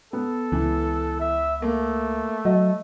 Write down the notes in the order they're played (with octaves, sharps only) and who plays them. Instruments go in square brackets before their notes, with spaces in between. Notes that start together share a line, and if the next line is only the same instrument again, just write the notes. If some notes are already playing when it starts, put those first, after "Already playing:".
[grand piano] B3 [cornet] A4
[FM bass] C#2 [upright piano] E3
[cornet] E5
[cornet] A3 [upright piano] A#3
[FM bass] F#3 [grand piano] D#5